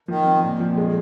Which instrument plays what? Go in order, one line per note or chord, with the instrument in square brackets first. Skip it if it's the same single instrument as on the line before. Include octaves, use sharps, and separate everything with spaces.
[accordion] D#3 [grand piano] F3
[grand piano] C4
A#2
F3
G#3